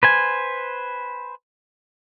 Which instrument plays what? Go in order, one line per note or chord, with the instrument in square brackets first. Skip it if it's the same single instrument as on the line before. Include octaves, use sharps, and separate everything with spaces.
[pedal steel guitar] B4 C5 G#5